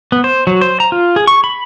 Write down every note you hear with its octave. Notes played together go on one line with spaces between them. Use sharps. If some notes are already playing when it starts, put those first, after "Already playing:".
B3
C5
F#3
C5
A#5
F4
G#4
C#6
B5